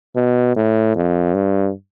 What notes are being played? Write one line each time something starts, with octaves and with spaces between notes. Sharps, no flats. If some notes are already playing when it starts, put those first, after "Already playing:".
B2
A2
F2
G2